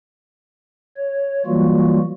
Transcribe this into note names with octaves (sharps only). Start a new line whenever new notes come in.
C#5
E3 F#3 G3 A#3 F4 F#4